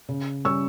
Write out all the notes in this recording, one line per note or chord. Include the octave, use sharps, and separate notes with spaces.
C#3
G3 C#4 C#6 E6